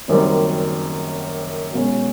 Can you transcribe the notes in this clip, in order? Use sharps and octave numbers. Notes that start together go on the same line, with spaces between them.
F#1 F#2 D#3 G3 C4
B1 B2 G#3 C#4